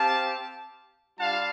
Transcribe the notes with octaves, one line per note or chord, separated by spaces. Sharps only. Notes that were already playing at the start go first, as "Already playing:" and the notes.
Already playing: C4 G4 F5 A5
G3 D4 F4 F5 A5